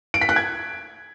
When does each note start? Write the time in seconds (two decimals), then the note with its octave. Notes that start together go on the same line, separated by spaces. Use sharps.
0.14 D7
0.21 B6
0.29 F#6
0.36 G#6